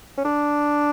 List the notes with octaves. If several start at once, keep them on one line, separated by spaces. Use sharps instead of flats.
C#4
D4